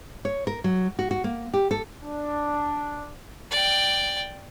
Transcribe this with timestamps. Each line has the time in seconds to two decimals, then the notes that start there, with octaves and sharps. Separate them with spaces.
0.25 C#5
0.47 A#4
0.64 F#3
0.99 F#4
1.11 F#4
1.24 A#3
1.54 G4
1.71 A4
2.02 D4
3.51 D5 G5